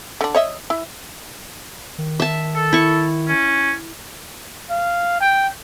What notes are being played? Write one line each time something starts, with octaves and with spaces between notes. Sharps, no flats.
D3 D4
C#5 D#5 E5
E4
D#3
E5 A5
A4
E4 C#6
C#4
F5
G5